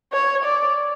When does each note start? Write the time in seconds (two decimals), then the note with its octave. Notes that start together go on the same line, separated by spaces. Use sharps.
0.13 C#5
0.44 D5